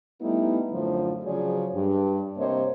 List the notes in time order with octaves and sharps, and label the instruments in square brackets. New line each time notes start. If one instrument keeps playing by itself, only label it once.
[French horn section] G3 A3 B3 D#4 E4
F#2 A2 D3 F3
C#3 F3 F#3 G#4 C#5 D5
G2
G2 C3 A#3 C5 C#5 D#5